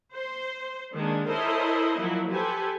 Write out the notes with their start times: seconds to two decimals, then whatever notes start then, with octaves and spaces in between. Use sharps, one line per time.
0.14 C5
0.92 D#3 G#3 A#3 D4
1.27 E4 A4 A#4 C5 C#5 D#5
1.97 F3 F#3 A#3 E4
2.30 G4 A4 B4 C5 G#5